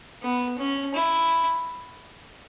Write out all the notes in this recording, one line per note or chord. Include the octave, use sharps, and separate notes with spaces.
B3
C#4
E4